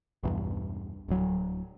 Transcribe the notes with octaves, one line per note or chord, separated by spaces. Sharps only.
B1 E2 G2
D1 F#3